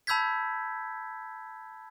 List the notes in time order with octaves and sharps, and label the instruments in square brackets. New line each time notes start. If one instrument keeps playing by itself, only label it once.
[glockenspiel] A5 B5 E6 G6 G#6 B6